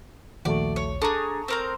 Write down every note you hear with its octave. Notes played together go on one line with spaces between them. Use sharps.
A#1 D#2 A3 F#4 D5
C#5
D4 G#4 A4 A#5 C#6 D#6
C4 A#4 C5